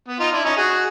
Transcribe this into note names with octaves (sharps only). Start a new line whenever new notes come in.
B3
D#4 F4
D4 E4
C#4 D#4
F#4 G#4